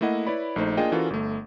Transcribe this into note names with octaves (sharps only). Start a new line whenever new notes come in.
A3 A#3 E4 D#5 F#5
E4 B4 C#5 D5 B5
A#1 A3 D#4 C5
A#3 D4 F4 G#4 D#5 G5
E3 C#4 F4 F#4 A4 A#4
G1 A3